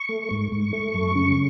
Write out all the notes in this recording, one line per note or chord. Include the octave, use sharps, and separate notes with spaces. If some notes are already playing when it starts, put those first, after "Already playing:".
Already playing: C#6
A3
G#2
G#2
A3
F#2
C#3